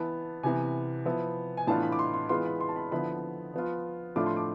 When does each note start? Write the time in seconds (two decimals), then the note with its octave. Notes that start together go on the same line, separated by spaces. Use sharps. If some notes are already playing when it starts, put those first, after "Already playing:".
Already playing: E3 B3 E4 A5
0.43 C3 E3 B3 G#5
1.05 F3 B3 E4
1.57 G#5
1.67 A2 E3 B3 D4 F4 A5
1.83 B5
1.92 D6
1.99 C6
2.14 C6
2.29 E3 G#3 B3 F4 C6
2.45 B5
2.61 C6
2.69 A5
2.76 B5
2.92 D3 F3 B3 E4 B5
3.54 F3 B3 F4
4.16 A2 F3 A3 D4 F4 D6
4.26 C6
4.37 D6